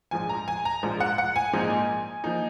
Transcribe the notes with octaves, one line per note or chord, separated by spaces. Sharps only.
A#1 G#2 F3 G#5
A#5
G#5
A#5
A#1 G#2 F3
F#5
F#5
G#5
A#1 G#2 F3 A#3 D#4
F3 A#3 D#4